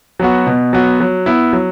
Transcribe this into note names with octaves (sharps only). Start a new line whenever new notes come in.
F#3 B3 F#4
B2
F#3 B3 F#4
F#3
B3 E4
F#3